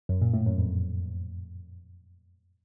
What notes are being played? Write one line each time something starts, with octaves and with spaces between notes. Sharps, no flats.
F#2
A#2
A2
F#2
F2